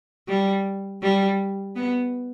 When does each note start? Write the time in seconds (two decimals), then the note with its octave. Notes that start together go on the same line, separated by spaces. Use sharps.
0.28 G3
1.02 G3
1.76 B3